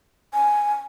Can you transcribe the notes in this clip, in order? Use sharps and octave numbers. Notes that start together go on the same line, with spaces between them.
G#5